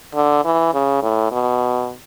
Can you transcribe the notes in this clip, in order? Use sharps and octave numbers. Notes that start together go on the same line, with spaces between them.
D3
E3
C#3
A2
B2